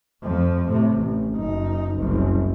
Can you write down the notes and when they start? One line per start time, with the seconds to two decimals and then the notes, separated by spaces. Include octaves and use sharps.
0.23 F2 F3
0.68 A2 C3
0.97 A1
1.34 F#1 D#4
1.95 F#1 C2